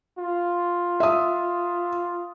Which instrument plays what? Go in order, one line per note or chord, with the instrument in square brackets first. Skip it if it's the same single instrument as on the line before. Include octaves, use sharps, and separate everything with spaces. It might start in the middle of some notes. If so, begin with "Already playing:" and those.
[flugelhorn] F4
[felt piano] E5 D#6